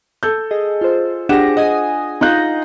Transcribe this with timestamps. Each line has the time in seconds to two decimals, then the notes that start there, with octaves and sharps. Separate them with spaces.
0.23 A4 G6
0.51 G#4 D#5
0.81 F4 C5
1.29 D4 G4 G#4 F#5 A#6 E7
1.57 D#5 F#5 G#5 D#6
2.21 D#4 F4 D#5 F#6 G6 A#6